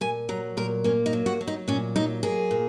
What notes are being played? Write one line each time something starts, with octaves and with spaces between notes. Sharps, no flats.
A#2 G#5
F#3 A#5
A#2 A#4
A#3 C#4
D#4
F#3
F#4
F#3
D#4
A#2 C#4
F#3 D#4
A#3 G#4
A#2